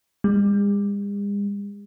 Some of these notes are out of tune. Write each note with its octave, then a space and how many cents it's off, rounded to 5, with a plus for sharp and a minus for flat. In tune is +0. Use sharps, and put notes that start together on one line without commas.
G#3 -45